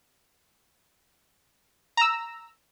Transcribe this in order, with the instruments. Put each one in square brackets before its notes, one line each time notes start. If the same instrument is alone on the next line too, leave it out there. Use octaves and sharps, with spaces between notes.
[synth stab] A#5 E6